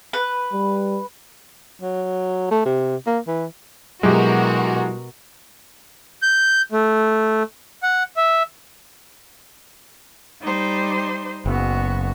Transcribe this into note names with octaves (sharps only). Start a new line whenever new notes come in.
B4
G3
F#3
A3
C3
A#3
E3
B2 F#3 G#3 E4 F#4 G4 A#4
G6
A3
F#5
E5
G3 D#4 C5
F#1 B3 F#4